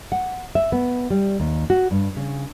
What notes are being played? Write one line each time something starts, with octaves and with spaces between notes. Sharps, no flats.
F#5
E5
B3
G3
D#2
F#4
G2
C#3